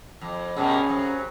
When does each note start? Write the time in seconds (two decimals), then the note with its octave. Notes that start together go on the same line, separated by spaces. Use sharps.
0.21 F2
0.56 B2 G3 A#3 C#4 G#4
0.86 C3 F#3